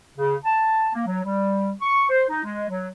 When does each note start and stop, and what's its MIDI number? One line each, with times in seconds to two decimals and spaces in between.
0.18 0.36 49
0.45 0.89 81
0.95 1.04 58
1.07 1.20 54
1.24 1.71 55
1.82 2.06 85
2.10 2.25 72
2.30 2.43 63
2.44 2.66 56
2.69 2.89 54